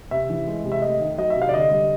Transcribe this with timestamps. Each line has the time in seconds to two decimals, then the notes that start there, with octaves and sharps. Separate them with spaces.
0.11 C3 E5
0.30 E3
0.47 G#3
0.64 C3
0.72 E5
0.82 A3 D#5
1.00 D#3
1.18 F#3 D#5
1.30 E5
1.36 C3
1.42 F5
1.49 D5
1.53 D3 D#5
1.71 G3